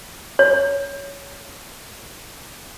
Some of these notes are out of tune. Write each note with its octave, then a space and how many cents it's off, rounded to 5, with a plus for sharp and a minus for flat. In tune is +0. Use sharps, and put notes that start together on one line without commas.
C#5 +15